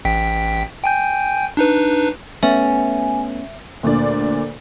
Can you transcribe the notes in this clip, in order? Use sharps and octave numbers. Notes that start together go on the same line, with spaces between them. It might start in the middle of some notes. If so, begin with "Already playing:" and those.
A1 G5 B6
G5 G#5 G6
D4 D#4 B4
A3 B3 C#4 E5 G#5
D2 A#2 D3 D5